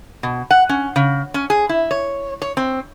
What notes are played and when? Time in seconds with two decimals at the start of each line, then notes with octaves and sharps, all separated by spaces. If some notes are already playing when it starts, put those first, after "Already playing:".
0.23 B2
0.51 F#5
0.69 C#4
0.96 C#3
1.34 C#4
1.50 G#4
1.69 E4
1.91 C#5
2.42 C#5
2.57 C4